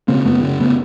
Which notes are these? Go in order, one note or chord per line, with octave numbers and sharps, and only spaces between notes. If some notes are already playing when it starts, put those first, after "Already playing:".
C#3 A#3 C4
F#2 A3 B3
C#3
C#3 A3 B3